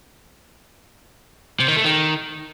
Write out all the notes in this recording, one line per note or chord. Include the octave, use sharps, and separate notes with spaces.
C3
D#3
A3
D#3